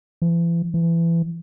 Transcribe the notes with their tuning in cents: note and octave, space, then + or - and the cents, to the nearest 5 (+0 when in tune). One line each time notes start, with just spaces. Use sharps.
E3 +40
E3 +25